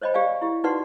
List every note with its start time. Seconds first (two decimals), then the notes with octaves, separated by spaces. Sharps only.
0.02 C5 C#5 D#5 G5 B5
0.14 G4 D5 F5 G#5
0.42 E4 G4
0.64 D#4 F#4 B4 D5 F#5 C6